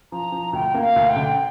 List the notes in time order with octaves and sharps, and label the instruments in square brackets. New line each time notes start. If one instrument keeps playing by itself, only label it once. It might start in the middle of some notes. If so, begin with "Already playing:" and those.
[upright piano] F3 [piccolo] A#5
[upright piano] F3
[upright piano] D2 [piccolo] G5
[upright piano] A#3
[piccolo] F5
[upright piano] D2
[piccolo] G5
[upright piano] D3